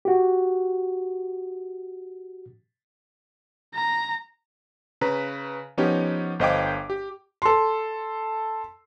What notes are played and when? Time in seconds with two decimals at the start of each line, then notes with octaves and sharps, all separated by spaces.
0.05 F#4 G4
3.75 A#5
5.01 C#3 B4 A#5
5.78 F3 B3 C#4 D#4 G4
6.39 G1 C5 D#5 F5 G5 D6
6.90 G4
7.42 A4 C6